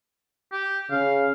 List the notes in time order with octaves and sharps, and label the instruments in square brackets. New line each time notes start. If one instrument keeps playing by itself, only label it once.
[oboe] G4
[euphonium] C#3 [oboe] F5